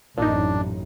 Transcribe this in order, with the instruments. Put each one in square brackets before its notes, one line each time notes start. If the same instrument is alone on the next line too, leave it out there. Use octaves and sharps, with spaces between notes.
[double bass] A1 F#2 [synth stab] A#2 D#4 [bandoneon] D4